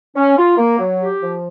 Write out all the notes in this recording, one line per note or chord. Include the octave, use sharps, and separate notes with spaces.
C#4
F4
A#3
F#3
G4
F3